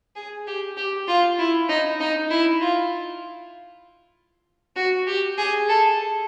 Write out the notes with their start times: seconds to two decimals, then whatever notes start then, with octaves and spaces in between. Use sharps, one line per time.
0.16 G#4
0.47 G4
0.77 G4
1.08 F4
1.39 E4
1.69 D#4
2.00 D#4
2.31 E4
2.61 F4
4.76 F#4
5.07 G4
5.38 G#4
5.69 A4